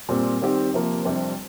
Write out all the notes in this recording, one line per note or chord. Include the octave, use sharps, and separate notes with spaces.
A#2 G3 C4
D#3 G3 C4 G4
C3 F3 A#3
F2 C3 G3 D4